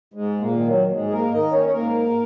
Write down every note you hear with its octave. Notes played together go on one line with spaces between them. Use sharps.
G#2 G#3
A#2 A#3
D#3
F#3
F#3
G#2 G#3
G#4
A#3 A#4
D#3 D#4 D#5
C#4 C#5
C#5
G#2 A#3 A#4